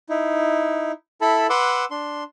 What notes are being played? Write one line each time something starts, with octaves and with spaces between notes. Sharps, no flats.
D#4 E4
E4 A4 A5 B5
B4 F#5 C6 D6 E6
D4 C6